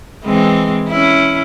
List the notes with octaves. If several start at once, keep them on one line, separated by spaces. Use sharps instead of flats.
E3 G#3 C4
C#4 E4